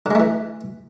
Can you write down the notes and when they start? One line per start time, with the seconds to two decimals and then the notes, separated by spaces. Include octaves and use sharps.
0.06 D3
0.11 G#3
0.15 A3
0.20 E3